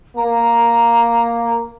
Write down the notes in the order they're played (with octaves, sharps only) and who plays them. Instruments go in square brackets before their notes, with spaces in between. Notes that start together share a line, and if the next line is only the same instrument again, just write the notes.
[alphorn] A#3 [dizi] A#5